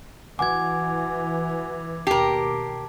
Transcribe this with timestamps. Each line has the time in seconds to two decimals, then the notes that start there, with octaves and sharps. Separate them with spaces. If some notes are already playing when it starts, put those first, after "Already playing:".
0.39 E3 F#4 F#5 G#5 D6 G#6
2.07 D#2 B2 G4 A#4 A5 C7